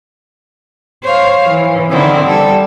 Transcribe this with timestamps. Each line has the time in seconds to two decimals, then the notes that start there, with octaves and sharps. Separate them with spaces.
1.04 C5 C#5 F5
1.50 E3
1.90 D3 D#3 C4 E4
2.27 G3 A4